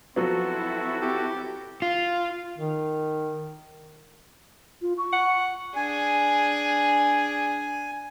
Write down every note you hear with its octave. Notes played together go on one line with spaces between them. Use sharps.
F3 F#3 B3 C4 E4 F#4 A4
G4
F4
D#3
F4
C#6
F#5
D4 G#4 G#5